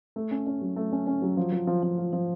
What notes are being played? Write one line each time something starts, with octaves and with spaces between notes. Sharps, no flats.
A3
C#4
C#4
F#3
A3
C#4
C#4
F#3
F3
F3
F3
F3
F4
F3